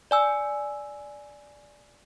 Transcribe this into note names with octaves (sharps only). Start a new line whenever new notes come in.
D5 G#5 E6